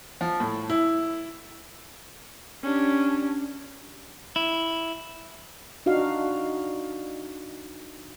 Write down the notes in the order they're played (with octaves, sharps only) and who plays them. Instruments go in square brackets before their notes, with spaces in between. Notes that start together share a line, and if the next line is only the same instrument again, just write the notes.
[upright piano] F3
A2
E4
[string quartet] C#4 D4 G4
[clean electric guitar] E4
[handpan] D4 D#4 F#4 F5